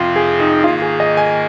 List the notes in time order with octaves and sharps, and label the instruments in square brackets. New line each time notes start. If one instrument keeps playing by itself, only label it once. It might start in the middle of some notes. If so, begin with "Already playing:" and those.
Already playing: [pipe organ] F2 C3 F3 C4 [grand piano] F4
[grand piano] G#4
D#4
[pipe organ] G#2 D#3 A#3 [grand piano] F4
[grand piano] G#4
D#5
G#5